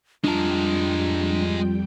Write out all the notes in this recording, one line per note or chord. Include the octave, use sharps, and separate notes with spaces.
F2 G3 G#3 D4 F4 A#4 G5 A5